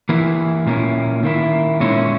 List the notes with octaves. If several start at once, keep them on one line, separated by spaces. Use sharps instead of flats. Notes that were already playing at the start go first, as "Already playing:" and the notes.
E3 A#3 E4
A#2 A#3 C#4 E4
D#3 A#3 E4
A#2 G#3 C#4 E4